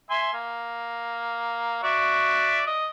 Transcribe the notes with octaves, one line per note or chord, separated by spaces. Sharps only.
E5 G#5 C6
A#3
F#4 D5 E5
D#5